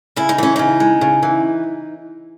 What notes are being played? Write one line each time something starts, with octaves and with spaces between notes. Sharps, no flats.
C#3 E4
D#4
E3 C#4
C#3 D#4
G#3
C#3
E3